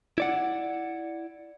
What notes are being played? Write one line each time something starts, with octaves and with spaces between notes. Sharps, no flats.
E4 D5 F#5